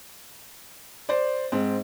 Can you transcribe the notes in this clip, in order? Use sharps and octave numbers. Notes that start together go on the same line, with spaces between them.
C5 D5
G#2 C4